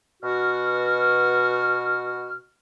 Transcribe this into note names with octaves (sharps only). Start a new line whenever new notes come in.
B2 F#4 F6